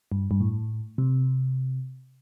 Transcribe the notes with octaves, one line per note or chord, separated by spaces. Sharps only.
G2
G2
A2
C3